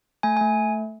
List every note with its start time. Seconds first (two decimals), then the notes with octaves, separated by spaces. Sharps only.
0.23 A3 G#5
0.37 G#5
0.41 A3